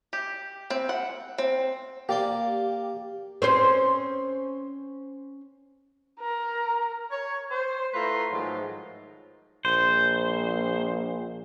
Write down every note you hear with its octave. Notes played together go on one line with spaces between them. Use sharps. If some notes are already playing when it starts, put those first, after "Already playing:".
G4
C4
F#5
C4
A#3 G4 D5 C6
C4 C#4 C5
A#4
C#5
C5
A3 E4 F4 B4 A#5 C6
G#2 D#3 F3 F#3 G#3 A3
A#1 C5